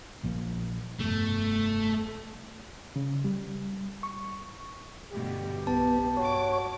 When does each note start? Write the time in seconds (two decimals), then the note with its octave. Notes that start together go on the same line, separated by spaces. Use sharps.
0.23 A#1 F3 A#3
1.00 F1 G2 B2 A3
2.96 C#3
3.24 G3
4.03 C#6
5.11 G2 B2 D3 G4
5.67 B1 B3 A5
6.17 G2 F#4 C#5 D6